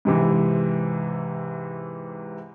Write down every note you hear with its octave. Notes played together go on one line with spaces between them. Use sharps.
G#2 C3 E3